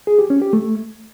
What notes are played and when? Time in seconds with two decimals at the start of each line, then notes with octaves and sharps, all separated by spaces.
0.07 G#4
0.19 G4
0.30 C#4
0.42 G4
0.53 A3